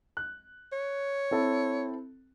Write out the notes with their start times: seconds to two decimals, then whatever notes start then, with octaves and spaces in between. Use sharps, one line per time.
0.17 F#6
0.73 C#5
1.31 C4 E4 A4